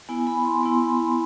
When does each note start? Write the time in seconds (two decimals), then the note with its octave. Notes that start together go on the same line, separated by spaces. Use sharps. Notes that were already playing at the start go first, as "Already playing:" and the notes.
0.09 B3 E4 G#5
0.27 B5
0.45 C6
0.63 B3 E4